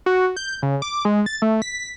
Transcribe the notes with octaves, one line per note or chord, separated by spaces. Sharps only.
F#4
G6
C#3
D6
G#3
A6
A3
B6